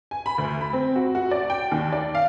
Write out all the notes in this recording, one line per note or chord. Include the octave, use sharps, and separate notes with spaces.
G#5
B5
D2
B5
C4
F#4
F#4
D5
G5
D#2
D5
F5